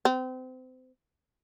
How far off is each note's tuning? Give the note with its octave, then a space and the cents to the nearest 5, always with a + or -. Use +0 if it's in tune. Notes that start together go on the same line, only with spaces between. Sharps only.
C4 -30